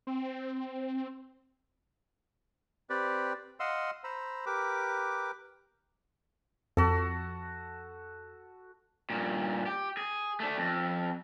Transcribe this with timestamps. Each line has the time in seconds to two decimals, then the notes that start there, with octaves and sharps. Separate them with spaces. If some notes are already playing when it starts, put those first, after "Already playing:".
0.07 C4
2.90 C4 G4 B4 D5
3.60 D#5 F5 F#5 C6 E6
4.04 C5 A#5 B5 E6
4.46 G4 A#4 B4 D6
6.77 F2 F#4 A4
9.10 G2 A#2
9.66 G4
9.97 G#4
10.40 A3 D4
10.58 F2